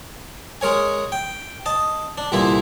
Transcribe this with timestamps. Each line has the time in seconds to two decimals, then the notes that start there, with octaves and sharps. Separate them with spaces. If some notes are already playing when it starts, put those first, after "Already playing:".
0.61 G#3 A#4 C#5 G#5
1.12 G5
1.66 D#5 A5
2.18 D4
2.32 C2 A#2 D3 E3 E4 E5